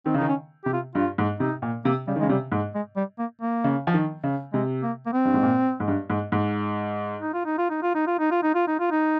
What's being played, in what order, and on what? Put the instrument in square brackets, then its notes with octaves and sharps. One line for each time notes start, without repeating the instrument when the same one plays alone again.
[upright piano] D#3 [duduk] C4
[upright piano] C#3
[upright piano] D#3 [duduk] D#4
[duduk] C#4
[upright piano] C3 [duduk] G4
[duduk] F4
[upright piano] G2 [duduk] F4
[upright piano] G#2
[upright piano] C3 [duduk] D#4
[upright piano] A#2
[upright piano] C3 [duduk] A#3
[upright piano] C#3 [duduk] G3
[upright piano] D#3
[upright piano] C#3 [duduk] G#3
[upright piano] C3 [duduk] G3
[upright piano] G#2
[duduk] G#3
G3
A#3
A#3
[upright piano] C#3
F3
D#3
C#3
[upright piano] C3 [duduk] G#3
[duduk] A#3
A#3
C4
[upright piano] G2
G#2
A#2
G#2
G2
G#2
G#2
[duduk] D#4
F4
D#4
F4
D#4
F4
D#4
F4
D#4
F4
D#4
F4
D#4
F4
D#4